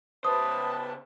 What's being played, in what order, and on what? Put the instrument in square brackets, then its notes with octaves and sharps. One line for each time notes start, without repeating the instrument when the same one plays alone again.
[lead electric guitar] C#3 C5 [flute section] B4 A5 [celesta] D#6